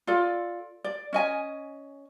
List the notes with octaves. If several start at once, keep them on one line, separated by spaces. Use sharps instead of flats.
F4 A4 D5
D5
C#4 D#5 G#5